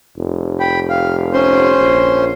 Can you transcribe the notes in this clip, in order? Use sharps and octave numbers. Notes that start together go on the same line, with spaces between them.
F1
G5 B5
F5
C#4 C5 C6
A#1